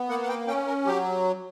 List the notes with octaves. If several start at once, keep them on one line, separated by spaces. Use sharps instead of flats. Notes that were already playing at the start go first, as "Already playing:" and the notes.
Already playing: B3
A#3 F#5
F#5
G5
C#4 G5
A#4
F#3 G4